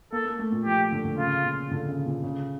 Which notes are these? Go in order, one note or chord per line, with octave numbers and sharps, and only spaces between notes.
A#3 A4
A#3
A3
A#2
F3 G4
D3
D3
C#3 F4
A#2
D3
C#3
A#2
C#3